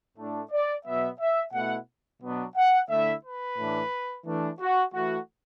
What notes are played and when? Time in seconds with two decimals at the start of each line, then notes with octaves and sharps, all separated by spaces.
0.18 A2 A3 D4
0.51 D5
0.85 B2 F#3 B3 E5
1.19 E5
1.53 B2 A3 E4 F#5
2.21 B2 F#3 B3 D4
2.56 F#5
2.89 D3 A3 E4 E5
3.23 B4
3.58 A2 E3 D4
4.26 E3 A3 D4
4.60 F#4
4.93 E3 A3 E4 F#4